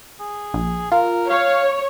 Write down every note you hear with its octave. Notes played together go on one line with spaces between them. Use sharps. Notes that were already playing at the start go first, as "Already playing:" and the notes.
G#4
A#1
F4 A#4
C#5 F5